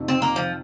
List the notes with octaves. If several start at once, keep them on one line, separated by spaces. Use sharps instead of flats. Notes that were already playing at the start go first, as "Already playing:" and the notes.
Already playing: F2 C3 D#3
C4
A#3
F3